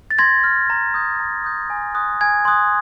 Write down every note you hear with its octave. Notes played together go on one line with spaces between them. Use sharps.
A6
C6 G#6 A#6
F6
A#5
D#6 G6
A#5
D#6 G6
G#5
C6 D#6 F#6
G#5 G#6
C6 D#6 F#6